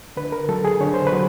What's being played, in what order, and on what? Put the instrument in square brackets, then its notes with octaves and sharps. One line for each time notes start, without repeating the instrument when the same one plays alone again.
[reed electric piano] D3 B4
A#4
F#3 A4
G#4
D3 C#5
C5
B4
F#3